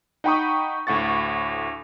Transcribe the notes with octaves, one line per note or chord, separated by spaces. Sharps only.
D#4 F#5 G5 B5 C#6 D#6
D2 A2 F#5 C#6 A6